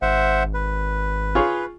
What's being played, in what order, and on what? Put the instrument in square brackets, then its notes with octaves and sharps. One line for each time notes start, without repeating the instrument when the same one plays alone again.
[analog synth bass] G#1 [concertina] C5 E5 F#5
[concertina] B4
[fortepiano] F4 G#4 C#5